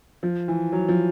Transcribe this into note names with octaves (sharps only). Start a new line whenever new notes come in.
F3
E3
F#3
F3